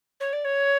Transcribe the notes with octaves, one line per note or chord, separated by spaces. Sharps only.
C#5
D5
C#5